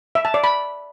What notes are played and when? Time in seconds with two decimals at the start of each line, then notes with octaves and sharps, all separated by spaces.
0.15 E5
0.25 A5
0.34 D5
0.44 B5